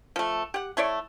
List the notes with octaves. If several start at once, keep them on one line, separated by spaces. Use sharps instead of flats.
F3 A3
G4 F#5
A3 E4 C#5 D5